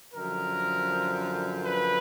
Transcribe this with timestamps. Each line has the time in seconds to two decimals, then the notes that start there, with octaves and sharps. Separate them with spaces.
0.14 F#2 D3 F3 A#4
1.62 B4